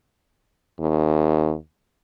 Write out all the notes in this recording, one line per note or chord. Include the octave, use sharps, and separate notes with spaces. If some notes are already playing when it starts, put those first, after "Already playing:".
D#2